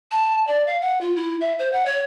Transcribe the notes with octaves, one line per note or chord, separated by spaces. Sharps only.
A5
D5
F5
F#5
F4
E4
E5
C5
F#5
C#5